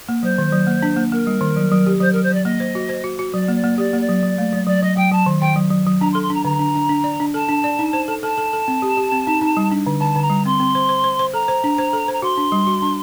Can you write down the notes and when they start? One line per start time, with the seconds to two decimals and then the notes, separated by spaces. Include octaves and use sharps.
0.09 A#3
0.23 F#3 C5
0.38 D#3
0.53 F#3
0.67 A#3
0.82 D4
0.96 A#3
1.12 A#3 A#4
1.27 G3
1.41 D#3
1.57 F#3
1.72 F#3
1.86 G4
2.00 F#3 C5
2.12 F#3 A#4
2.23 C5
2.31 F#3 D5
2.45 A#3 D#5
2.60 C5
2.75 F#4
2.89 C5
3.04 F#4
3.19 F#4
3.34 F#3 D5
3.48 A#3
3.56 D5
3.64 A#3
3.78 G4 D5
3.93 A#3
4.01 D5
4.09 F#3
4.23 F#3
4.38 A3
4.52 F#3
4.67 F#3 D5
4.82 F#3 D#5
4.97 F#3 G5
5.11 F#3 A5
5.26 D#3
5.41 D#3 G5
5.56 F#3
5.71 F#3
5.87 F#3
6.00 D4 A#5
6.12 C6
6.15 A4
6.22 C6
6.30 D4 A#5
6.45 D3 A#5
6.59 D4
6.75 D4
6.89 D4
7.04 D5
7.20 D4
7.34 A4 A5
7.49 D4
7.64 D5
7.79 D#4
7.93 C5
8.08 A4
8.23 A4 A5
8.38 A4
8.53 A4
8.68 C4
8.82 G4
8.97 G4
9.12 C4
9.27 D#4
9.42 D#4
9.57 G3
9.72 D4
9.87 D3
10.00 D3 A5
10.16 D3
10.22 A#5
10.30 G3
10.46 C4 C6
10.60 C4
10.75 C5
10.89 C5
11.04 C5
11.19 C5
11.34 A4 A#5
11.48 C5
11.64 D4
11.78 C5
11.93 A4
12.08 C5
12.13 A#5
12.22 F#4 C6
12.37 D4
12.52 G3
12.67 F#4
12.82 D4